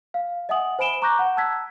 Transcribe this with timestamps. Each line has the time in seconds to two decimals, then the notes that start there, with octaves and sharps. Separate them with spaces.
0.14 F5
0.49 D#5 E5 F#5 G#5 D#6 F#7
0.79 C5 G#5 B5 D7 E7 G7
1.02 A#5 C#6 D6 F#6 G6 A#6
1.19 F#5
1.37 A5 E6 F#6 G#6 B6